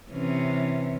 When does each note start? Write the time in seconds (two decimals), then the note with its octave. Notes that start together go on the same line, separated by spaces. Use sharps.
0.11 C3 E3 C#4